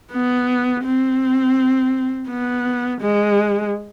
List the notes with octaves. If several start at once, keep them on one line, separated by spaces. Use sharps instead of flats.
B3
C4
B3
G#3